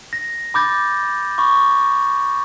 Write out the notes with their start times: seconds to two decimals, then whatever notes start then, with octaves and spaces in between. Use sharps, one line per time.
0.13 A#6
0.54 B5 D6 G6 A6
1.38 B5 C#6 D6